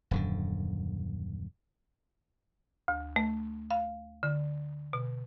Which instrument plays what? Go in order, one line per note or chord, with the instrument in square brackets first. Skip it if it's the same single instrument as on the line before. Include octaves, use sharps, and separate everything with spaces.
[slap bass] D#1 F#2 D3
[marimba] D2
A3
F5
D3
B2